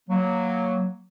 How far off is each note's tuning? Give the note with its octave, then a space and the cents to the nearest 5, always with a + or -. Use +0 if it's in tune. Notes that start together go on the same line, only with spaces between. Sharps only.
F#3 +0 A#3 +0